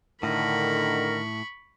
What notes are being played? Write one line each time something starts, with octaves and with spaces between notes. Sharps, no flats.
A2 D3 D#3 A#4 B5 C#6